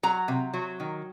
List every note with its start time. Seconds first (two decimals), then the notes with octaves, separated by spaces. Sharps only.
0.03 F#3 A#5
0.28 C3
0.54 F#3
0.80 D#3